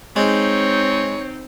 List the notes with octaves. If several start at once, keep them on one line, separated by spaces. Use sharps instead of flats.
G#3 C4 D#4 C#5